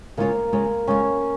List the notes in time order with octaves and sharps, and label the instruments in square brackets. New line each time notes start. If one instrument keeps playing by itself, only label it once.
[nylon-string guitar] C#3 G#3 F4 C#5 [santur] A#3
[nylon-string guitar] C#3 G#3 F4 C#5
[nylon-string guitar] C#3 G#3 F4 C#5 [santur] C#4